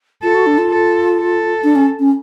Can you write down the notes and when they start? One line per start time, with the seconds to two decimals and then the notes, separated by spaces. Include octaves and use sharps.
0.22 F4 A4
0.34 F#4
0.47 D4
0.58 F4
0.69 A4
1.16 A4
1.64 D4
1.75 C#4
1.99 C#4